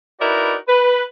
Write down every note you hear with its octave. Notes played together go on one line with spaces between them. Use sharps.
D#4 E4 F#4 A#4 B4 D5
B4